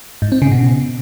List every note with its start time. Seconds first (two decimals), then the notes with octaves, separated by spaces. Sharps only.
0.22 G#2
0.32 C4
0.42 C#3
0.52 B2